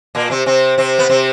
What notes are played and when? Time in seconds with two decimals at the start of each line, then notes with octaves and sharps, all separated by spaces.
0.15 A#2 A#3
0.30 C3 C4
0.46 C3 C4
0.78 C3 C4
0.99 B3
1.09 C3 C4